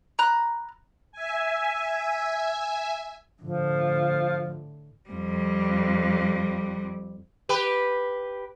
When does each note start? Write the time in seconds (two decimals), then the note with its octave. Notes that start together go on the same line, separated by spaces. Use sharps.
0.19 A#5 B5 F#6
1.12 E5 G#5
3.42 A2 D3 F3
5.10 F2 G3
7.49 G4 B4